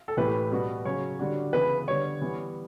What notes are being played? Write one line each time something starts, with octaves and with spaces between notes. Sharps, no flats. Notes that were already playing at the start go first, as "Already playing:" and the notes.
A4
A2 E3 A3 E4 G4 B4
B2 G3 B3 F#4
C#3 F#3 C#4 C#5
D3 G3 D4 F#4
C#3 E3 B3 E4 B4
D3 G3 B3 C#5
E3 G3 B3